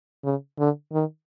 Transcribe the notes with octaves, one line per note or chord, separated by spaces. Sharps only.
C#3
D3
D#3